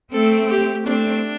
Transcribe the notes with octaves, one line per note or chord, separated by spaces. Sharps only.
A3 C4 A4
G4
A3 C4 D4